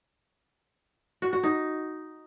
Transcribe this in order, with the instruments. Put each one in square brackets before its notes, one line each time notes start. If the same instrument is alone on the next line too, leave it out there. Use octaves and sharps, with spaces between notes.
[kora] F#4
F#4
D#4